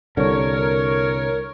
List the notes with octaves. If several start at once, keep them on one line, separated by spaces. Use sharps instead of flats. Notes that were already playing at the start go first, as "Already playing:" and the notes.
C2 D3 A#4 C#5